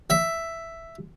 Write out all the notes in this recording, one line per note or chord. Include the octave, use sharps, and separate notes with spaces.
E5